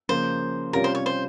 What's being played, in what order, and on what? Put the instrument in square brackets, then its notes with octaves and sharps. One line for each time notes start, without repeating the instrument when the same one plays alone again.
[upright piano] C#3 F3 A#3 [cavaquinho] C5
[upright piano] C3 G3 C#4 F4 [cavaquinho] A#4
[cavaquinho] C5
C#5
C5